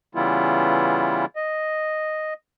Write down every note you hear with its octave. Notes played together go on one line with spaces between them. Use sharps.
C#3 E3 G3 B3 E4 F4
D#5